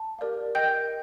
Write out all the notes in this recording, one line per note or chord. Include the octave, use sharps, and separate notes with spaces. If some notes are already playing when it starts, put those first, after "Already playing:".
Already playing: A5
G4 A#4 D5 F5
A#4 D#5 G5 G6